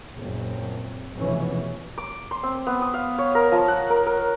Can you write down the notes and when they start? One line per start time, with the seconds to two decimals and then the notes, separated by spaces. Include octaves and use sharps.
0.18 F#1 A#2 C4
1.17 F1 F2 G#2 B2 E3 C#4
1.98 D6
2.31 C6
2.43 C4
2.67 B3
2.82 D#6
2.94 F5
3.18 C#5
3.35 A#4
3.52 F3
3.68 F#5
3.90 A#4
4.06 A#4